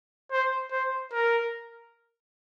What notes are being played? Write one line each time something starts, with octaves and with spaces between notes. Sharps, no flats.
C5
C5
A#4